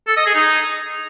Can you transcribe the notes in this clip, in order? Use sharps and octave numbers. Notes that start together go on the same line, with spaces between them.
A4
D#5
G#4
D#4